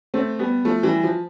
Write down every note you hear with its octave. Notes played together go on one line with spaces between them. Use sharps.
A3 C4
G3 B3
F3 A3
E3 G3
F3